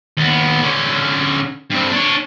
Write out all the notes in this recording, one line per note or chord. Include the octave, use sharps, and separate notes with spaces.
D#2 B3
D3 C#4
G2 C4
D4 C#5